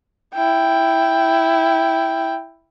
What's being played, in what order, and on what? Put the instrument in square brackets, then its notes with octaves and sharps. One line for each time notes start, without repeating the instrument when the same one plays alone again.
[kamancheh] E4 G5